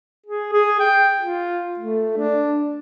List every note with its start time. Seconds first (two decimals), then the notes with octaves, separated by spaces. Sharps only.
0.26 G#4
0.53 G#4
0.80 G5
1.22 F4
1.79 A3
2.17 D4